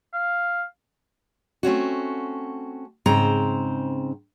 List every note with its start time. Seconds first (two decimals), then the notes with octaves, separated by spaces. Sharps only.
0.13 F5
1.63 A3 C4 C#4 F#4
3.06 G#2 C#3 C4 C5 A#5